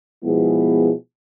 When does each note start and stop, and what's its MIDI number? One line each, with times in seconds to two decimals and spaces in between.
0.24 0.91 47
0.24 0.91 53
0.24 0.91 56
0.24 0.91 59
0.24 0.91 64
0.24 0.91 68